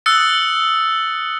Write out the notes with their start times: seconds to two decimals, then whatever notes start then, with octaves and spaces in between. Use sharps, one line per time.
0.06 D#6 E6 F#6 A6 C#7